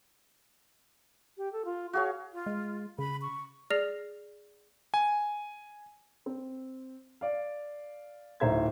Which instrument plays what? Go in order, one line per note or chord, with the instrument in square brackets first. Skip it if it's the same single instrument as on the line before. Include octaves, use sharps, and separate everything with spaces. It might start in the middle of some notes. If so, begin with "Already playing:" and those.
[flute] G4
A4
F4
[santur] F#4 G#4 C#5 [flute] F5
[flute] F4
[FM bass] G#3
[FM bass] C#3 [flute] B5
[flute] C#6
[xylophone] G#4 D5 F6 A#6 C7 F7
[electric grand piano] G#5
[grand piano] C4
D5 F5
D1 D#4 C5 E5 A#5 G#6